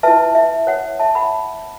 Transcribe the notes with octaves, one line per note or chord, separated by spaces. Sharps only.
E4 B4 E5 A5
E5
C#5 F#5
E5 A5
F#5 B5